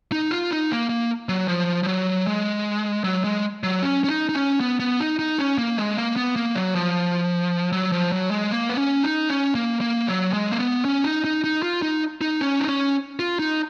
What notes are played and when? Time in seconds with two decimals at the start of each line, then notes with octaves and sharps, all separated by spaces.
0.12 D#4
0.31 F4
0.51 D#4
0.71 A#3
0.90 A#3
1.29 F#3
1.48 F3
1.83 F3
1.87 F#3
2.27 G#3
3.04 F#3
3.24 G#3
3.63 F#3
3.82 C#4
4.04 C#4
4.09 D#4
4.29 D#4
4.35 C#4
4.60 B3
4.80 B3
5.00 D#4
5.19 D#4
5.39 C#4
5.58 A#3
5.77 G#3
5.97 A#3
6.16 B3
6.36 A#3
6.55 F#3
6.75 F3
7.72 F#3
7.92 F3
8.12 F#3
8.31 G#3
8.51 A#3
8.70 B3
8.77 C#4
9.03 D#4
9.29 C#4
9.55 A#3
9.81 A#3
10.07 F#3
10.33 G#3
10.52 A#3
10.59 B3
10.85 C#4
11.04 D#4
11.25 D#4
11.44 D#4
11.62 F4
11.82 D#4
12.21 D#4
12.41 C#4
12.59 D#4
12.68 C#4
13.19 F4
13.39 D#4